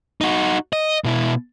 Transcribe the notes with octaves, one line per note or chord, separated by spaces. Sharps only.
D#4 F#4
D#5
B2 E4